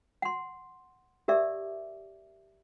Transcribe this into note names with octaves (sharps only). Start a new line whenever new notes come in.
F#5 C6
G4 A#4 D5 E5 D6